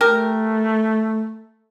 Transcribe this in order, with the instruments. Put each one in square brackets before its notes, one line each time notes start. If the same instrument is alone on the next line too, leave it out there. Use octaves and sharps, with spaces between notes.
[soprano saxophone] A3 [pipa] G4 A#4